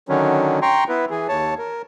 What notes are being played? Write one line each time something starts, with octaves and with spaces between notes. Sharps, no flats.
D3 D#3 F#3 C#4
G5 A#5 C6 C#6
B3 E4 B4
E3 G#4
D#2 C#5 A5
A#4